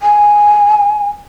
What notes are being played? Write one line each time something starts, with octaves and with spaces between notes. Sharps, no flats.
G#5